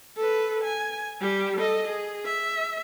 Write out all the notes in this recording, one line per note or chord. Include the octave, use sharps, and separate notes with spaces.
A4 B4
G#5
G3 G4
A4 D#5
G#4
E5